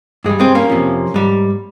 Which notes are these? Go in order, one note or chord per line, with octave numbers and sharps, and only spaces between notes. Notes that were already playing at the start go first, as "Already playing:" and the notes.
G2 G3 G#3
G#3 C4
A#3 C#4
F2 C3 F3
G#2 G3